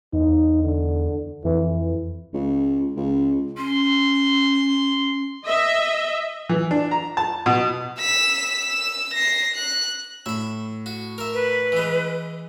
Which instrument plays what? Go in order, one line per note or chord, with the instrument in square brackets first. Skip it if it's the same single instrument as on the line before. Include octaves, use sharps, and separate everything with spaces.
[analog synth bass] E2 [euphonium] D#4
[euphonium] D3
[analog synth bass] F2 [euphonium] E3
[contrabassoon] C#2
C#2
[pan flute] C#4 [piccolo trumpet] C6
[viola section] D#5 E5
[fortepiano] E3
D4
A#5
A5
B2
[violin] E6 B6
E6
A#6 C7
F#6
[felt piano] A2 [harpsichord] E5 B5
[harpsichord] F#4
A#4 E5
[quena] B4
[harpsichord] E3 G#3